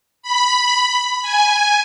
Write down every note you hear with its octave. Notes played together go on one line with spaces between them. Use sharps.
B5
G#5